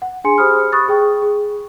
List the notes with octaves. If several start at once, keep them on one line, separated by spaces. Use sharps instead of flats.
F#5
D4 G#4 G#5 C6 C#7
G4 G#4 C5 B5 D#6 F6
B5 C#6 D#6 F#6 A6
G#4 G5 C#6
G#4